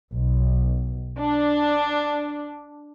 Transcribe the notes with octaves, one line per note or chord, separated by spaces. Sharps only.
B1
D4